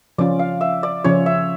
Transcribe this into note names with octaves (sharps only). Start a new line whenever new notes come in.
C#3 F3 C#4 F4 D5
F5
E5
D5
C#3 F3 C#4 F4 C#5
E5